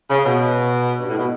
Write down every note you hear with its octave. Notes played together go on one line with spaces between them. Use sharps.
C#3
B2
G2
A2
B2